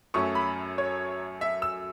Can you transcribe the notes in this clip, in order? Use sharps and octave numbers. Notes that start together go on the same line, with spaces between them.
F#2 F#3 A3 C#4 C#6
B5
C#5
E5
E6